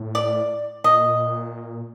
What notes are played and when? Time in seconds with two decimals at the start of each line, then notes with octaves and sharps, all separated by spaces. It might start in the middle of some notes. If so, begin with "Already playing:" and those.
Already playing: A2
0.15 D5
0.84 A#2 D#5